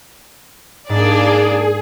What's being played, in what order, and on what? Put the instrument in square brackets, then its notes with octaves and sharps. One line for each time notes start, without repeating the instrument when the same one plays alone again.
[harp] G#2 [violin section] A#3 D4 D5 [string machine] G#4